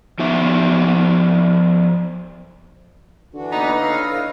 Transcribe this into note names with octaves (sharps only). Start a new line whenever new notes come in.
F3 B3 D#4 E5
D3 E3 D4 F#4
A#3 B3 D#4 B4
A4 B4 C#5 D#5 F5
D3
E4 B4 C#5